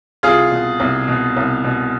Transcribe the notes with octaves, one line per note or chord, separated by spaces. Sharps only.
C2 F4 G#4
B2
C2
B2
C2
B2